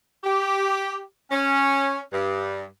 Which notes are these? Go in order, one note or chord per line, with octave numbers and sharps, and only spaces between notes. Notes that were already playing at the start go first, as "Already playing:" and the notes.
G4
C#4
G2